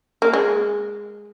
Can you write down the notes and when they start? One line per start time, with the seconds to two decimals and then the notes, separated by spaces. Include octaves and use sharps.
0.22 A#3
0.33 G#3